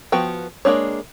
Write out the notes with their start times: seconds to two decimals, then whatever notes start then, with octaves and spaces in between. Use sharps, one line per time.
0.12 F3 B3 F#4 G5
0.65 G#3 A#3 D4 C#5